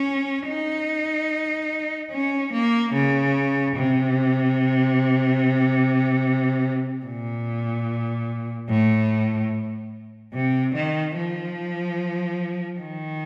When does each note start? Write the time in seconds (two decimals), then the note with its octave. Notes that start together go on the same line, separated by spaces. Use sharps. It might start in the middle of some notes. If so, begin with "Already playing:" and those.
Already playing: C#4
0.48 D#4
2.12 C#4
2.53 A#3
2.93 C#3
3.76 C3
7.05 A#2
8.69 A2
10.33 C3
10.75 D#3
11.16 F3
12.80 D#3